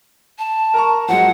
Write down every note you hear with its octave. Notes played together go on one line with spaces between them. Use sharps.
A5
A#4 A#5 C#6
F3 F#3 G#3 F#5